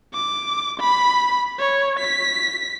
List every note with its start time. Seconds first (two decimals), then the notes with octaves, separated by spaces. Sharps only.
0.14 D6
0.80 B5
1.59 C#5
1.99 B6